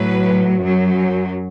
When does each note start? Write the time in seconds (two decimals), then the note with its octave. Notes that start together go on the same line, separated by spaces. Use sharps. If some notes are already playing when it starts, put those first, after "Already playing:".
Already playing: A2 F#3 B4
0.60 F#2 F#3